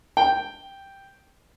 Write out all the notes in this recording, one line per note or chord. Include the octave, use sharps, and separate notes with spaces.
G5